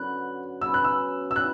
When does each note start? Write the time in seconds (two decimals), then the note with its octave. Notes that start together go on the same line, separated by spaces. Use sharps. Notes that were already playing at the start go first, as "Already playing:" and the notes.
Already playing: F#2 D3 F#3 B3 F#4 F#6
0.61 C#3 F#3 B3 E6
0.74 F#6
0.84 E6
1.31 E6
1.36 E3 G3 F#6